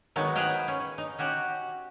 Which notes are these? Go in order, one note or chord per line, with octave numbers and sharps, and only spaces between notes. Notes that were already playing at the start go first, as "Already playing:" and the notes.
D#3 F#3 G#3 B3 D#4
G#4 B4 C5 F5 G5
C#4
D#4
C#4 F#4 G4